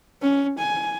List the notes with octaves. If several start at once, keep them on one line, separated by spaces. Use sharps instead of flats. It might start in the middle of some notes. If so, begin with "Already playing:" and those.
C#4
G#5